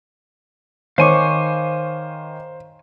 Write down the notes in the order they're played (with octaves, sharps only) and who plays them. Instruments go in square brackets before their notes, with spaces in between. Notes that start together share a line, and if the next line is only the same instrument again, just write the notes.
[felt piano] D#3 [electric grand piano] C5 [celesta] C#5 D6 [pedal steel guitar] F5 G#5 C#6